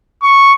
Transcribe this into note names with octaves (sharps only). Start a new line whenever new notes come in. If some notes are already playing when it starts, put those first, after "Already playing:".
C#6